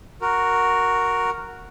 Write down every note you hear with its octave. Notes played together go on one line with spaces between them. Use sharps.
F#4 A#4